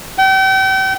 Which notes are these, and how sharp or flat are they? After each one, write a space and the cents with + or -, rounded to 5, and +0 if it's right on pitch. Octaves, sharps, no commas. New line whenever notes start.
G5 -40